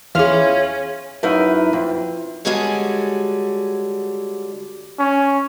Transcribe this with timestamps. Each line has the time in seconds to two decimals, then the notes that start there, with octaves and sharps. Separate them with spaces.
0.15 E2 C#4 E4 F4 G#4 F5 F6
1.23 F#2 D#4 E4 B4 F5
1.73 F2
2.45 D3 G3 G#3 F#4 G#4 C#5
4.99 C#4